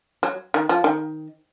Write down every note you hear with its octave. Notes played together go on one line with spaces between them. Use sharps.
F#3
D#3
F3
D#3